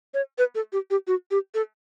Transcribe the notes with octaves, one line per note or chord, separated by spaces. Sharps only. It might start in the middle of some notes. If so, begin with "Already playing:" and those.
C#5
B4
A4
G4
G4
F#4
G4
A4